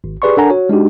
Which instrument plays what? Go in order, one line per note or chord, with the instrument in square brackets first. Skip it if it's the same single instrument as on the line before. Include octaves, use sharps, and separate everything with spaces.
[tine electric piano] G#1
G4 G#4 B4 D5 C6 C#6
D4 A4 A#4 F#5 G#5 A#5
F#4 C#5
G#3 D4 D#4 F#4 G4